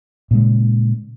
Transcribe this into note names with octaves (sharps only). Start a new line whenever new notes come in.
A#2 C#3 G#3